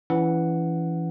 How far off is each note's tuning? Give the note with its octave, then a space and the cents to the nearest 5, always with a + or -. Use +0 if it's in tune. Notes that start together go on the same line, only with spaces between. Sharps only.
E3 +15 C#4 +30 F#5 +0